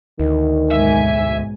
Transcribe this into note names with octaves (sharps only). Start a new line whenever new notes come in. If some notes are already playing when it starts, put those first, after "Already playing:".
D2 D#3
B1 G#2 E5 G#5